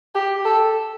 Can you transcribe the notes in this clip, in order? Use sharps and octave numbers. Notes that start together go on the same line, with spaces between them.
G4
A4